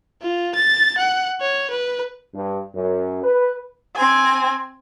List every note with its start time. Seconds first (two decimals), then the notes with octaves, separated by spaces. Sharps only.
0.22 F4
0.55 A6
0.98 F#5
1.41 C#5
1.70 B4
2.33 G2
2.73 F#2
3.23 B4
3.96 C4 G#5